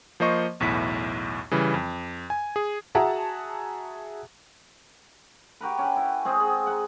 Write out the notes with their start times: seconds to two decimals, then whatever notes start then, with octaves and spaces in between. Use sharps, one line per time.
0.20 F3 A#3 C5 D#5 C#6
0.60 B1 E2 A2 E4 B6
1.51 C#3 E3 G3
1.74 F2
2.30 G#5
2.56 G#4
2.95 F#4 G#4 E5 F#5 A5 A#5
5.61 F#4 G4 A#4 B4
5.79 C#4 B4
5.96 E4
6.25 G#3 C4 G#4 D#5
6.40 G#4
6.67 F#5 A#5